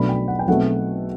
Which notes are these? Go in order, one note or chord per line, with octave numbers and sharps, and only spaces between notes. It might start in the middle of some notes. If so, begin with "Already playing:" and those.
Already playing: B1 B2 A3 D4 B5
G5
F#5
G5
B1 B2 A3 C4 F#5